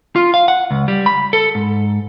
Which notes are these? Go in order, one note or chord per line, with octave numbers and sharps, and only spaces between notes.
F4
F5
F#5
C#2
G3
B5
A4
G#2